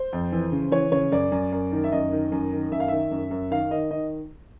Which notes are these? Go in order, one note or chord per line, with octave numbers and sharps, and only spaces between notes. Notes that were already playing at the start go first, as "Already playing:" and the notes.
Already playing: C5
F2
E3
C#3
E3 C#5
C#3 C#5
F#2 D5
F#2
F#2
D#3
E5
F#2 D#5
D#3
F#2
D#3
F#2 E5
F5
D#3 E5
F#2
F#2
D#3 F5
D#3 D#5
D#3 D#5